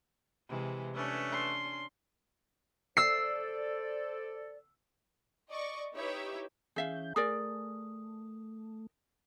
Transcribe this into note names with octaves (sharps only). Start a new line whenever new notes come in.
C3 E3 G#3
A3 C#4 D4 B4 C#5
C6
A4 C5 D5 E6 C7
D5 D#5 C#6
D#4 E4 G4 B4 C#5 E5
E3 C#4 G#4 E5 F5 G6
A3 G#4 A#4 D5 D#6